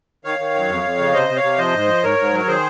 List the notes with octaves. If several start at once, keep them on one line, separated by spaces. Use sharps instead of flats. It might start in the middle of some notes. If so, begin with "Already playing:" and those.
D#3 C#5 F5
D#3
F#2
F2
F2
C#3
C3 C5 D#5
C3
C#5 F5
C3
F3 C5 D#5
G#2
F3
G#2 A#4 C#5
G#2
F#3
C#5
D#3 G#4 C5